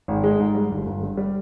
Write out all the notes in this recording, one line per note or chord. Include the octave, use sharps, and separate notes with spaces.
G#1
G#3
G#2
G3
G1
G1
G2
G3